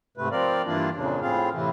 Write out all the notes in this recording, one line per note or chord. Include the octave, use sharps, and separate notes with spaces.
G#2 C3 A3 B4
F3 C4 A#4 D5 F5
G2 E3 A#3 D4 F4
F2 A#2 C#3 D4
A2 C4 F4 G#4 F5
A2 C3 E3